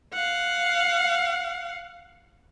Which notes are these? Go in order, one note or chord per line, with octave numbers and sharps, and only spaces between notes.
F5 F#5